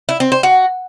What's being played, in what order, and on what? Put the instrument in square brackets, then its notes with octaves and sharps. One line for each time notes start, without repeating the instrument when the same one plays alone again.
[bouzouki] E4
C4
C5
F#4